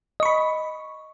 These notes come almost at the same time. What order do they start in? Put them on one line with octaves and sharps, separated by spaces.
D#5 C#6 B5